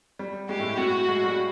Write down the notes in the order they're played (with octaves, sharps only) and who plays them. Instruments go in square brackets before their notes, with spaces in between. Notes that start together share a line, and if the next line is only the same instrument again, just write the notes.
[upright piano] G3
[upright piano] G#3 [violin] G4
[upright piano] A2 A3
G#3
[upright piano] A2 A3 [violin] F#4
[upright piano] G#3
G3